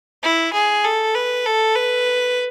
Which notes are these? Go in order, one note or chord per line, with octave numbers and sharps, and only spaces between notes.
E4
G#4
A4
B4
A4
B4